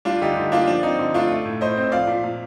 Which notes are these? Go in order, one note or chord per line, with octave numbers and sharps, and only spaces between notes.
G3 D4 F4
D3 D#4 G4
D3
A#3 D4 F4
F3 D4
C4 D#4
D3
A3 D4 F4
A3
A2
A2 C5 D#5
C4
F3 D5 F5
A#2
A#2